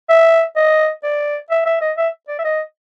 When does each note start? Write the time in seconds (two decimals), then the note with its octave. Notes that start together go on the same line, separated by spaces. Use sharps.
0.09 E5
0.56 D#5
1.03 D5
1.50 E5
1.66 E5
1.81 D#5
1.97 E5
2.28 D5
2.39 E5
2.44 D#5